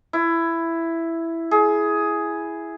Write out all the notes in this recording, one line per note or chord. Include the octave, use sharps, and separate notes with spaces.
E4
G#4